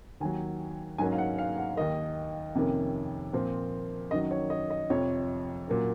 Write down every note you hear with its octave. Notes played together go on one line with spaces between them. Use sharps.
D#2 D#3 F#3 G#5
G#2 F#3 A#3 C#4 G#5
F5
F#5
F5
F#5
D#2 D#3 A#3 D#5
F2 C3 D#3 A#3 C#4
A#2 F3 C4
F#2 D#3 F#3 D#5
C#5
D#5
D#5
F2 C3 F3 C#5
A#2 F#3 A#3 C#4